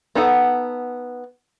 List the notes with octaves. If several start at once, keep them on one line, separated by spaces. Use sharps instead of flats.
B3 D#4 A4 F#5